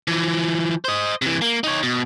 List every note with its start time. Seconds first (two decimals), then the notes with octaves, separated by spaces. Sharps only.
0.08 E3 F3
0.85 C5 D#5
1.22 C3 E3
1.42 A#3
1.64 D#4 C#5
1.83 B2